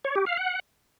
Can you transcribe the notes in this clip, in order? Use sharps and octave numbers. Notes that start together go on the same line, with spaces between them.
C#5
G4
F5
F#5